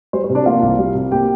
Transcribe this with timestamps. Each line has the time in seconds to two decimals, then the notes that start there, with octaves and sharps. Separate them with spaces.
0.13 G3 C5
0.24 C5
0.29 C3
0.35 D4 D5
0.46 A#3 F4 F5
0.62 C2
0.78 G3
0.95 C3
1.11 A#3 G4 G5